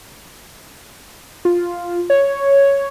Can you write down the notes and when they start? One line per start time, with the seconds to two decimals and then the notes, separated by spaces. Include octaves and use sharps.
1.45 F4
2.10 C#5